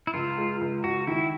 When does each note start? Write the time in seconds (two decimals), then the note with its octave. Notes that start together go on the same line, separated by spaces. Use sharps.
0.07 E4
0.14 C#2 F4
0.37 G#3
0.61 C#2
0.84 C#2 F#4
1.07 D#3 E4